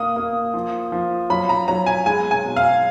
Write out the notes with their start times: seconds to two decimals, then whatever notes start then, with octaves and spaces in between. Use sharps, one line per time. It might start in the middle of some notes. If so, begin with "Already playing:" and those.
Already playing: B2 A#3 D#6
0.16 A#3
0.54 F3
0.92 F3
1.30 F#3 B5
1.49 A#5
1.68 F#3 A#5
1.86 G#5
2.06 G#3 G#5
2.31 G#5
2.44 B2
2.56 F5